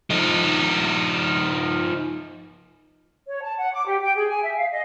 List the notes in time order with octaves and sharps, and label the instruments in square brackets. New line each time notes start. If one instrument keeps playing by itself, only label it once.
[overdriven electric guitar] F3 D#4
[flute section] C#5
A5
F#5
D6
G4
G5
G#4
G#5
E5
F5
D#5